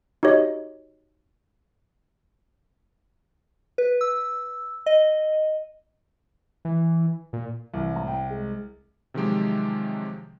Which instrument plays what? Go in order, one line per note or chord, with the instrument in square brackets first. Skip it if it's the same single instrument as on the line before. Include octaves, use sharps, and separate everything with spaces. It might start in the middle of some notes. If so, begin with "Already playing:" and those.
[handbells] D#4 F#4 G4 C#5 D#5
[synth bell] B4
E6
D#5
[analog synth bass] E3
A#2
[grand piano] C2 [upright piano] E3
[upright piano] A2 A#5
G5
G#3
[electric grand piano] C3 D#3 F3 F#3 G#3 G4